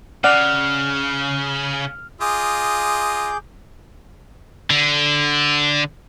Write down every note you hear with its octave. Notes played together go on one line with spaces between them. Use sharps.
C#3 D5 F#5 F6 F7
F4 G#4 D#5 D6 G6
D3